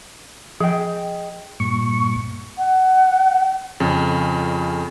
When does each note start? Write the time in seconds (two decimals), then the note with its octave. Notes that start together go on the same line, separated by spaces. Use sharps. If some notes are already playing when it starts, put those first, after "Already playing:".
0.60 F3 G#4 D#5 G5
1.60 G2 A#2 C#6
2.58 F#5
3.80 F2 C#3